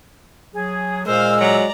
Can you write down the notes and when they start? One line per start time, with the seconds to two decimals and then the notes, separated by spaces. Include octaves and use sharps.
0.54 F#3 G#4
1.06 A#2 G#3 A#4 C5 F5 E6
1.40 F#3 D5 A#5